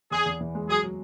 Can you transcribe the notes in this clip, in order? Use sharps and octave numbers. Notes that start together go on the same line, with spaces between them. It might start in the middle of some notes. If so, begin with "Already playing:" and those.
E2 G#4
E2
E3
G#3
F#3 G#4
F#3